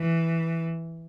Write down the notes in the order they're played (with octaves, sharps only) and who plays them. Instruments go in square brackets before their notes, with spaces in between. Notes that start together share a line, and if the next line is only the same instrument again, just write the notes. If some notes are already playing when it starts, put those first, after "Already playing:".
Already playing: [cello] E3